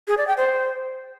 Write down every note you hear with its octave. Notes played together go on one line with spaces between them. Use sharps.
G#4
D5
G5
C5